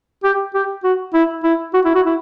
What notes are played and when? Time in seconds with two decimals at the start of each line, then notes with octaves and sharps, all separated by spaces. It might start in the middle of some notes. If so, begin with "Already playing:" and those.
0.24 G4
0.54 G4
0.84 F#4
1.14 E4
1.44 E4
1.74 F#4
1.85 E4
1.95 F#4
2.06 E4